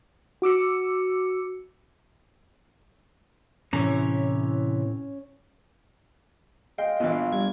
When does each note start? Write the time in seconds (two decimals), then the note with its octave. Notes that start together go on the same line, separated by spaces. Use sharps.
0.42 F#4 D6 E6 C#7
3.73 A2 C3 E3 C#4 C#5 A#5
6.78 G#3 D#5 F5 G5
7.00 A#1 E3 B3 D4 F4
7.32 G3 G#6